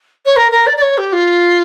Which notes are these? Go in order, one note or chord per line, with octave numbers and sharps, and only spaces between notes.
C#5
A#4
A#4
D5
D5
C#5
G4
F4